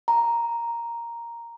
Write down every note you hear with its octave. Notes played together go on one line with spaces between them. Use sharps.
A#5